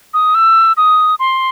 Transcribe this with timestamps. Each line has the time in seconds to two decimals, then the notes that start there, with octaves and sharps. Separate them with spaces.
0.14 D#6
0.35 E6
0.77 D#6
1.19 C6